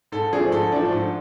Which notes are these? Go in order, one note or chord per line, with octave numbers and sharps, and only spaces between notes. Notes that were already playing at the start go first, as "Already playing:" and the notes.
G#2 A4
F3 A3 D4 G#4
G#2 A4
F3 A3 D4
G#2